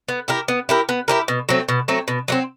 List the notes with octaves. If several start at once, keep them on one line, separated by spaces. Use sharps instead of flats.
B3
E4 G4 A#4
B3
E4 G4 A#4
B3
E4 G4 A#4
B2
F#3 A3 C4
B2
F#3 A3 C4
B2
F#3 A3 C4